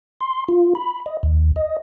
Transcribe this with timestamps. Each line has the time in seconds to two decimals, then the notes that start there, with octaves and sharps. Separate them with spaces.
0.21 C6
0.48 F4
0.75 B5
1.06 D#5
1.23 D#2
1.56 D#5